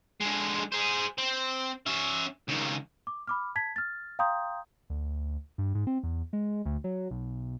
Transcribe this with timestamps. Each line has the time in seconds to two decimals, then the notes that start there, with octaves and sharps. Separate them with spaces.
0.20 D3 G#3
0.72 G#4 C5
1.18 C4
1.86 C#4 E5
2.48 C#2 D#3
3.07 D6
3.27 B5 D6 F6
3.56 A5 G#6 B6
3.76 F6 A6
4.19 F5 G5 A#5 C6 D#6 G6
4.90 D2
5.58 G2
5.75 G#2
5.87 C4
6.03 E2
6.33 G#3
6.65 D2
6.84 F#3
7.11 B1